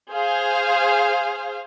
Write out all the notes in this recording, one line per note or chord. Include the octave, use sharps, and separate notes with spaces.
G#4 C5 F5